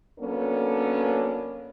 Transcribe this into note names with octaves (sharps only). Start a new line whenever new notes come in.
F#3 A#3 B3 C#4 D4 A4